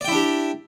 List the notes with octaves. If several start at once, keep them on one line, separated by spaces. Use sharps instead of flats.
D4 E4 G4 D5 G5